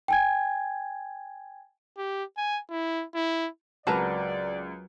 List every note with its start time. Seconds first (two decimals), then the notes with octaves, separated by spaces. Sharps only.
0.08 G5 G#5 G#6
1.97 G4
2.37 G#5
2.70 E4
3.15 E4
3.87 C#2 F#3 C4 A#4 B4 D5 A5 A#5